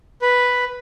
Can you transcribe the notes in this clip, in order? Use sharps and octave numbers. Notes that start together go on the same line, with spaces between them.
B4